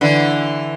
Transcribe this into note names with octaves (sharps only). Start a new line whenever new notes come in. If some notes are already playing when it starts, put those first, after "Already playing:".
D3 E3